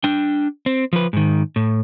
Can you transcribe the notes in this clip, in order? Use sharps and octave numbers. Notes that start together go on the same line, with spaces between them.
D4 G5
C4
F3 B4
G#2 D#3
A2